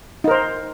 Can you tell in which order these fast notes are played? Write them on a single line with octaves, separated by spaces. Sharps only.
D#4 A#4 C5